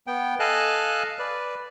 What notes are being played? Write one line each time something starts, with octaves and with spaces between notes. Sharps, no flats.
B3 G5
A4 D#5 F5 G#5 A5 F#6
B4 D5